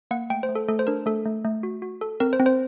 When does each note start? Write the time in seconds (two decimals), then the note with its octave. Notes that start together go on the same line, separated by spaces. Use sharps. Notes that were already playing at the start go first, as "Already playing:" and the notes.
0.11 A#3 F#5
0.30 A3 G5
0.43 C5
0.49 A3
0.55 A4
0.68 A3 A4
0.79 C5
0.87 D4 A#4
1.06 A3 A4
1.25 A3
1.45 A3
1.63 F#4
1.82 F#4
2.01 A4
2.20 C4 A#4
2.33 C5
2.40 C4
2.46 C5